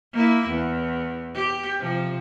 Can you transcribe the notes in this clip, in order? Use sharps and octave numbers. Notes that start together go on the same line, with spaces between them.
A#3 E4
E2
G4
C3 F3